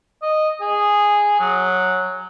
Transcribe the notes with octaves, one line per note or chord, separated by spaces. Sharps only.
D#5
G#4
F#3